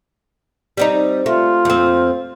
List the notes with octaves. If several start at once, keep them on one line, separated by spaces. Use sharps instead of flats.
G3 C4 D#4
A3 F4
F2 C4